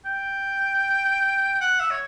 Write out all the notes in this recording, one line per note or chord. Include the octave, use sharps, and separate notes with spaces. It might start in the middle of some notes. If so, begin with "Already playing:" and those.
G5
F#5
E5
C#5